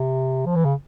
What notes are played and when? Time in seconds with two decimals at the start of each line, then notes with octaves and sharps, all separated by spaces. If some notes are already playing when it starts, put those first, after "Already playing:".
Already playing: C3
0.46 F3
0.56 E3
0.65 C#3